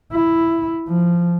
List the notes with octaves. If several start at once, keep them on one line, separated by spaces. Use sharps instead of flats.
E4
F3